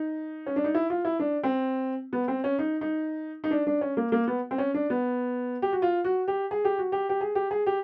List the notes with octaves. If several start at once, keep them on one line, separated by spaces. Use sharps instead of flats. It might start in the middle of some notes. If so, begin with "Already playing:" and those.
Already playing: D#4
C#4
D4
D#4
E4
F4
E4
D4
C4
B3
C4
C#4
D#4
D#4
D#4
D4
D4
C#4
A#3
A#3
B3
C4
C#4
D4
B3
G4
F#4
F4
F#4
G4
G#4
G4
F#4
G4
G4
G#4
G4
G#4
G4